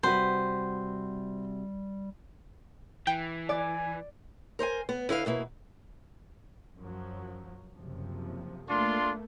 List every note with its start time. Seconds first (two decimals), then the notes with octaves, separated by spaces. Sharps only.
0.03 C3 G3 F#4 B4 C5
3.07 E3 G5
3.49 D5 G#5
4.59 A#4 C5 D5 G#5
4.89 B3
5.09 D3 E4 B4 F5
5.26 B2 A#3 E4
6.78 F#2 F3 F#3
7.77 F#1 C3 F3
8.69 A3 A#3 D4 F4 C6